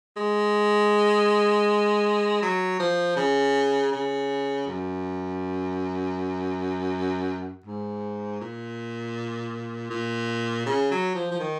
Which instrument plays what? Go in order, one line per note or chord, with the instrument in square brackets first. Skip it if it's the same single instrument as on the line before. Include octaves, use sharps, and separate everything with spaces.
[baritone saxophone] G#3
F#3
F3
C#3
C#3
F#2
G#2
A#2
A#2
C#3
F#3
F3
F3
D#3